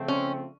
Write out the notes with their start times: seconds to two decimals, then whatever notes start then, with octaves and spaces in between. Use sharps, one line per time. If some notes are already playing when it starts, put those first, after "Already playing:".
Already playing: C#3 F3 A3 C4
0.08 C#4